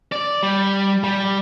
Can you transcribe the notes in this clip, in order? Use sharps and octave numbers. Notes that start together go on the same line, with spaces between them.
D5
G3
G3